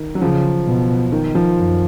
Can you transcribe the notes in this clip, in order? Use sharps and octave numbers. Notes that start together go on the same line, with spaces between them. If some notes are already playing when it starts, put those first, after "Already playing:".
Already playing: D#3
F#3
C#3 F3
B2
D#3
F3
F#2